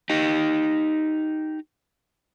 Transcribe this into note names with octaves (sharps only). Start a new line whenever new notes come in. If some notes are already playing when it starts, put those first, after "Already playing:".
D#4 G4